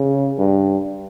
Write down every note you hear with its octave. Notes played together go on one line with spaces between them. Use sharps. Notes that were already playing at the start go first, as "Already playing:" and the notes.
Already playing: C#3
G2